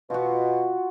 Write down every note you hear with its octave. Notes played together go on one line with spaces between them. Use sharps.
B2 F4 F#4